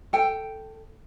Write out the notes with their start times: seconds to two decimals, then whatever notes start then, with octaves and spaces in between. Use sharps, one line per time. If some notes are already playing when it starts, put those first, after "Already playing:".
0.13 A4 G5